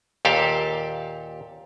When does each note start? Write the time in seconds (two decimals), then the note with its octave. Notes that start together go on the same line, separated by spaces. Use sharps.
0.25 D#2 A#2 G4 A4 F5